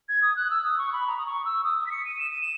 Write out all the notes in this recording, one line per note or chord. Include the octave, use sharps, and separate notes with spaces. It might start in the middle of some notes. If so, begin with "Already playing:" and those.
G#6
D#6
F#6
E6
D#6
C#6
B5
A#5
D#6
C#6
E6
D#6
D#6
B6
C#7
D#7
E7
D#7
E7